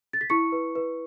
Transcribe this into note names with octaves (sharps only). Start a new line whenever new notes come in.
A6
B6
E4 C#6 C#7
B4
B4